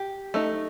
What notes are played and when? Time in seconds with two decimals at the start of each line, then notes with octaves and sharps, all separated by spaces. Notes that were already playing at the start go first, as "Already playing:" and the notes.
Already playing: G4
0.34 A3 D#4